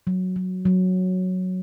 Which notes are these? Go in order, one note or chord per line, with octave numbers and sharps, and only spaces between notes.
F#3
F#3
F#3